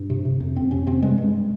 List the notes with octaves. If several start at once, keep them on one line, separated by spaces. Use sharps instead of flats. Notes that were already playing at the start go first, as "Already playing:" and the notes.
Already playing: G2
C3
C3
F2
F2 C4
C3 C#4
C3 C4
G2 G#3
G2